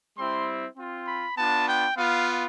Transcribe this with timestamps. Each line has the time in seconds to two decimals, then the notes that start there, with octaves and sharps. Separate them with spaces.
0.17 G3 C4 E4 C6
0.77 C4 F4
1.07 B5
1.37 B3 D4 F4 A5
1.67 G5
1.97 B3 F4 F5